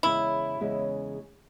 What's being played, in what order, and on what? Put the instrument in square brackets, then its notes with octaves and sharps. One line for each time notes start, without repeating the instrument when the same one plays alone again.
[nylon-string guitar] E2 C#3 G#3 C#4 [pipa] E4
[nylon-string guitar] E2 C#3 G#3 C#4